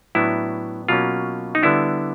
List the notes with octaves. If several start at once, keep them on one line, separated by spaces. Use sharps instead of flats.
A2 F#3 B3 D4 E4
B2 F#3 A#3 C#4 F4
D#4
D3 G3 B3 D4 E4